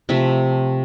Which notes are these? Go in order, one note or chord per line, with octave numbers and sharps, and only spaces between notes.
C3 F3 A3 E5